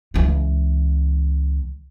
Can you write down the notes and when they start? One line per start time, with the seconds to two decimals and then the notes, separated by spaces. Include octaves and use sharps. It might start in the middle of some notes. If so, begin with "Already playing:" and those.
0.14 C#2 E3